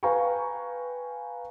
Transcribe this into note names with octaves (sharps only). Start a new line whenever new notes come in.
B4 F5 G5 G#5 A#5 C#6